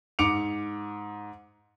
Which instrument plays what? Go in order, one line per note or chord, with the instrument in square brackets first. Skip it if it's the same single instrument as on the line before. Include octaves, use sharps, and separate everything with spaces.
[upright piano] G#2 D6 C#7 D7 F7